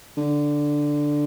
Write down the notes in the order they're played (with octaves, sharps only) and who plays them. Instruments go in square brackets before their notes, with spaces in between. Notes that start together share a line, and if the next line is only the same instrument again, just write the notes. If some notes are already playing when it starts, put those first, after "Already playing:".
[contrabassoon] D3